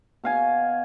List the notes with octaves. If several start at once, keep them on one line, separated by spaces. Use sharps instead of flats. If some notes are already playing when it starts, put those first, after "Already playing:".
B2 F5 G#5